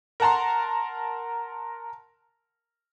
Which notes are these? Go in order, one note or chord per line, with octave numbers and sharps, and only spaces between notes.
A#4 F#5 A5 A#5 C6